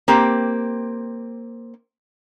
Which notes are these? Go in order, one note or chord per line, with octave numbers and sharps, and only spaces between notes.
A#3 C4 G4